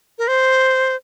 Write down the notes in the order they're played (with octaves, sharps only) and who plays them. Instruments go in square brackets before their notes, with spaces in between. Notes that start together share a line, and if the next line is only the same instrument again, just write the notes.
[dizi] A#4
C5